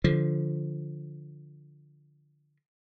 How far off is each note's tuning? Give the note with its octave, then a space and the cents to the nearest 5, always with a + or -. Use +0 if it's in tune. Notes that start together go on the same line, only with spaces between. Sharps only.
D3 +0 F3 +0